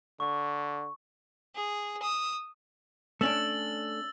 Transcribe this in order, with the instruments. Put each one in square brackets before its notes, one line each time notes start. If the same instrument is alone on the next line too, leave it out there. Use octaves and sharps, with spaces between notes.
[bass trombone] D3 [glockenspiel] C#6
[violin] G#4
D#6 E6
[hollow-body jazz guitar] A3 C#4 D4 [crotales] E6 A6 F#7